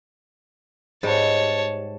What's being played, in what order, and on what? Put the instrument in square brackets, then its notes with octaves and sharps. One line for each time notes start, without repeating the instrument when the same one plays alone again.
[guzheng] G#2 G3 [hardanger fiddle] C#5 A5